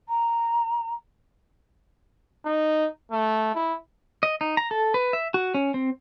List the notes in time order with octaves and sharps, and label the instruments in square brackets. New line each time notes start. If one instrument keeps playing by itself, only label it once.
[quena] A#5
[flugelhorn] D#4
A3
E4
[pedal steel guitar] D#5
D#4
A#5
A4
B4
E5
F#4
C#4
C4